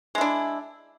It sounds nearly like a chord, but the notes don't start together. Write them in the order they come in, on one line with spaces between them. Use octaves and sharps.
G#3 E4 D4